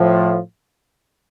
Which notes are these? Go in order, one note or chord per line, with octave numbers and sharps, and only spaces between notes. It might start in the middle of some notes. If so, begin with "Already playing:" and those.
Already playing: A2 F3